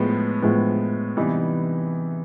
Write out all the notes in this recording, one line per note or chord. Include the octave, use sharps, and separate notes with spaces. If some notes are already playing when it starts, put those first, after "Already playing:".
Already playing: A2 F3 G#3 B3
A2 F3 G#3 B3
C3 E3 G3 B3 D#4